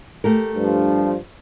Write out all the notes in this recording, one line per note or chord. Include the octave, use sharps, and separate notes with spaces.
A3 G4 A#4
G2 F3